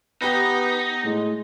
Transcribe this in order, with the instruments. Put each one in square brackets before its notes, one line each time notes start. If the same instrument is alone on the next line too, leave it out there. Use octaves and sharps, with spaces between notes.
[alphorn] B3 [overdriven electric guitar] D#4 [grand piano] G4 B4
[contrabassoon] A2 [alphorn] G#3